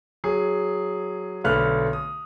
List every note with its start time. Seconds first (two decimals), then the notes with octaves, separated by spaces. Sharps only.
0.24 F#3 G#4
1.44 B1 D3 A3 B4 F6 F#6
1.93 D#6